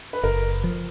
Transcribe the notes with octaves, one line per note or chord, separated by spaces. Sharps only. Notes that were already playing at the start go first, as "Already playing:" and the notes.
B4
F#1 A#4
F3